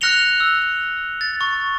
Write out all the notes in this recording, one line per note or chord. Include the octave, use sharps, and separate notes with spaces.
F6 F#6 A#6 C#7 F7 G7
E6
A6
C#6